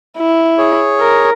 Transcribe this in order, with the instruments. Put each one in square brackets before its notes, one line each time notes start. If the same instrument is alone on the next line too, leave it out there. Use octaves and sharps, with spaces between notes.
[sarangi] E4
[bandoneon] G#4 C#5
[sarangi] A#4